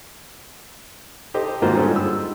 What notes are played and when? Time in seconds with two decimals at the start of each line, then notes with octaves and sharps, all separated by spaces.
1.34 D#4 G4 A4 C5 D#5
1.62 G#2 D#3 A#3 F4 F#4 C5
1.75 G2 D3 G3 G#3 C#4 F4
1.96 E6